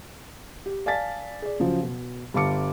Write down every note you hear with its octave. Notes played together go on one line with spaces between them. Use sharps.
G4
D5 F5 G#5 A5 A6 B6
G#4 D5
C#3 F3 F#3
B2
G1 G3 F5 A5 D6 C#7